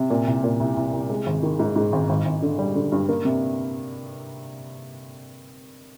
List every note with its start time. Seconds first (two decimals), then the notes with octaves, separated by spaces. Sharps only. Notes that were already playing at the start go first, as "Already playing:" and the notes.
Already playing: C3
0.10 A#2
0.27 C2
0.44 A#2
0.60 C2
0.77 C2
0.93 C2
1.10 G#3
1.26 G#1
1.43 D#3
1.59 G#2
1.76 G#2
1.92 G#1
2.09 G#1
2.25 G#1
2.42 D3
2.59 G3
2.75 D3
2.92 G2
3.09 A#3
3.25 C3